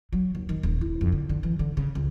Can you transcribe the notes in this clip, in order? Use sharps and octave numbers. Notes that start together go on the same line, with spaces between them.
F#3
D#2
D#3
D#1
E4
F2
D3
D3
E3
D3
C#3
C#2